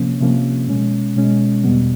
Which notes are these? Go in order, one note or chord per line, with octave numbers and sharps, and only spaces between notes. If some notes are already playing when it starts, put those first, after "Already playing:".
Already playing: C3 F3 A#3 C#4
C3 F3 A#3 C#4
B2 G#3 C#4
B2 G#3 C#4
E2 B2 G3 B3